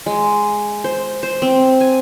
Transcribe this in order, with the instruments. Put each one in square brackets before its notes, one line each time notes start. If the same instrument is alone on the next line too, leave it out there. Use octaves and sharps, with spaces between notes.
[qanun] G#3
C5
C5
C4
G#5